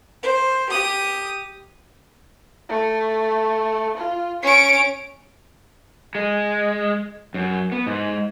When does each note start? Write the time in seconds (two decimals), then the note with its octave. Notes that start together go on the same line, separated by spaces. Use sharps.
0.23 C5
0.71 G4 D#6
2.69 A3
3.97 F4
4.43 C#4 C#6 D7
6.15 G#3
7.34 F#2
7.72 B3
7.87 G#2